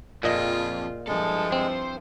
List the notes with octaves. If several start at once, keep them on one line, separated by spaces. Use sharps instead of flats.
F2 A#2 F4 G#4 D#5
G2 F3 G#3 E4 A4
C4 C5